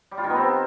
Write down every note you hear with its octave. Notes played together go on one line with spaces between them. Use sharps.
G3
F4
D#3
B3
C4